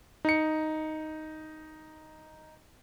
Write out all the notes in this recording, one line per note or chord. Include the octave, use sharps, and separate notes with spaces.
D#4 C#7